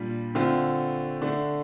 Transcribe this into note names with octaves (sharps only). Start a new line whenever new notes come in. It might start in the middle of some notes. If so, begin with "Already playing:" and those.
Already playing: A#2 G3 D4 F4
D3 A3 C4 F4
D3 A3 D4